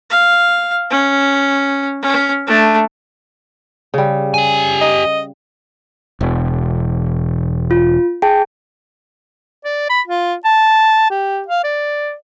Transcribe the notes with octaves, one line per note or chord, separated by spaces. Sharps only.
F5
C#4
C#4
A3 D4
C#3 G3
G4 G#5
D#5
E1
F4
G#4 G5 A5
D5
B5
F4
A5
G4
F5
D5